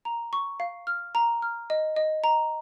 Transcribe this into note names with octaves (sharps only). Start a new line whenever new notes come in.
A#5
C#6
F5
F6
A#5
F6
D#5
D#5
A#5